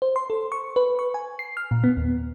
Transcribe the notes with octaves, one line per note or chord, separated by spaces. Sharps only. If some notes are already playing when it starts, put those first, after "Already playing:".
C5
C6
A4
C#6
B4
C#6
G#5
C7
F6
A#2
B3
D#2